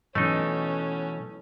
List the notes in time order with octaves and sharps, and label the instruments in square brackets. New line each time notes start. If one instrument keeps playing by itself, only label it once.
[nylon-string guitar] B2 E3 F#3 [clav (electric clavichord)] A3 D#4 [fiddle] C#4 A4